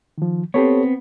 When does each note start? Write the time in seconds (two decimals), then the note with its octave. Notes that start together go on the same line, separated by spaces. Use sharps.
0.18 D#3 F3
0.54 B3 C4 G4 A4 C#5